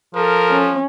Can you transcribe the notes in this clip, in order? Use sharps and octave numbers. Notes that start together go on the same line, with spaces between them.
F3 A4 A#4
C#4